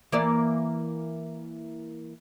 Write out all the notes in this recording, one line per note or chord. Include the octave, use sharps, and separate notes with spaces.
E3 A#3 D5